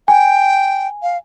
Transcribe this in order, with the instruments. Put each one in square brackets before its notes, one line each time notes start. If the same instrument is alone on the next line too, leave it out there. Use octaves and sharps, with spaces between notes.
[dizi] G5 [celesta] G#5
[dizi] F5